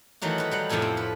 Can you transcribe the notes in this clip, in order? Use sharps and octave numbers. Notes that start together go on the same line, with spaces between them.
D#3 E3 F#3 A3 F#4
F#4 B4
F#3 G3 F#5
F2 A2 C3 F3 A4 G#5
C4
B4